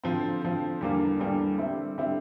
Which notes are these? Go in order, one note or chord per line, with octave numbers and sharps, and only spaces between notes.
D3 F3 C4
D3 F3 C4
E2 D3 G3 A#3 D4
E2 D3 G3 A#3 D4
D3 G3 C4 E4
D3 G3 C4 E4